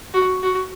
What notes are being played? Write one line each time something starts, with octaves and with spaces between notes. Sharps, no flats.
F#4
F#4